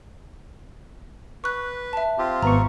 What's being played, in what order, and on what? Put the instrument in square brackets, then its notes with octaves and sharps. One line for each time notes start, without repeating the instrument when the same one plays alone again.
[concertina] B4 [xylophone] C#6 F#6
[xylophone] E5 A5
[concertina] C4 F4 G4
[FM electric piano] G#1 B3 C#6 [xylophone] A#5